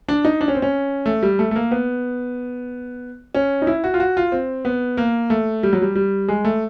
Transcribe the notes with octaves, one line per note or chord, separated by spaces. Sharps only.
D4
D#4
D4
C#4
C4
C#4
A3
G3
A3
A3
A#3
B3
C#4
D#4
E4
F#4
F4
F#4
F4
C4
B3
A#3
A3
G3
F#3
G3
G3
G#3
A3